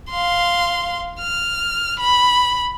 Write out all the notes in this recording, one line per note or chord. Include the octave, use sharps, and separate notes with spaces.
F5 C6
F6
B5